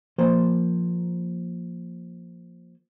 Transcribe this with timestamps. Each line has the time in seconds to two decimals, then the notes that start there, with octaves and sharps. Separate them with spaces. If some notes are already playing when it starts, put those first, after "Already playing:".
0.18 F3 A#3 C5